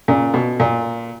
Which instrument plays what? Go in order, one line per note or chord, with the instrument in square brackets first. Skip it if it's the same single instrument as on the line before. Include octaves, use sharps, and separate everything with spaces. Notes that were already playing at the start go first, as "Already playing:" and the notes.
[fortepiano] A#2 C#3
B2
A#2